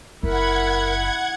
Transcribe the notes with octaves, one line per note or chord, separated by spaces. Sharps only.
F#1 E4 A#4 F#5 B5 G#6